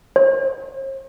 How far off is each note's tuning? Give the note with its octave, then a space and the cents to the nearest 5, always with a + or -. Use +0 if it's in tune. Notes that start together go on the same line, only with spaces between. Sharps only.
C5 +45